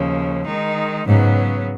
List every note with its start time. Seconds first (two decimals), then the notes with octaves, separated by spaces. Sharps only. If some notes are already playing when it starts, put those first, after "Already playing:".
Already playing: D#2 C#3 F3
0.47 D#3 G#3 D#4
1.07 G#2 C#3 F#3 B3